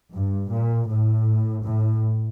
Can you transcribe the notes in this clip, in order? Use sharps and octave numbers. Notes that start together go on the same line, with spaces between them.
G2
A#2
A2
A2